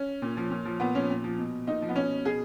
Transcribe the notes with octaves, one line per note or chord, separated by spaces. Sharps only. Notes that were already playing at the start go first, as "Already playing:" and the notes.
Already playing: C#4
A#2
F3
A#2
F3
A#2 B3
F3 C#4
A#2
F3
B2
A#2 D#4
F3
B3
B2 C#4
B2 G#4